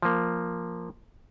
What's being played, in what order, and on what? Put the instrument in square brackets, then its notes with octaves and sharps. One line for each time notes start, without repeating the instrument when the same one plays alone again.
[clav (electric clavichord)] F3 A#3